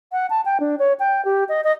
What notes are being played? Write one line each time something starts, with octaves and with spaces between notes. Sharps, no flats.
F#5
A5
G5
D4
C#5
G5
G4
D#5
D#5